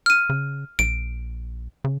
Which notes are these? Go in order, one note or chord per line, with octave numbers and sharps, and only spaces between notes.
F6 D#7
C#3
A#1 D7
C#3